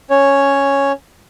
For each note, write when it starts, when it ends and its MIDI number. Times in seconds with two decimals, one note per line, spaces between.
0.10 0.92 61
0.10 0.92 73